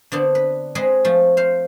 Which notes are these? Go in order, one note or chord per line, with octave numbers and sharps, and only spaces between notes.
D3 B3 C4 D4
B4
G#3 C4 G#4 B4 D#5
F3 A3
C5 F5